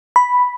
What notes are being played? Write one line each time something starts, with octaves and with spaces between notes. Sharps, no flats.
B5